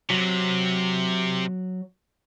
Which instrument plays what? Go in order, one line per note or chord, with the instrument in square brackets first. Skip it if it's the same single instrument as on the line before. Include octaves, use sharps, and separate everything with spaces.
[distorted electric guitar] C3 [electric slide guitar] F#3